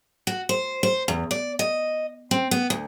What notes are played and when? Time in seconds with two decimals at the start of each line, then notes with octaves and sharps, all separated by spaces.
0.27 F#4
0.49 C5
0.83 C5
1.08 E2
1.31 D5
1.59 D#5
2.31 C4
2.51 B3
2.70 D2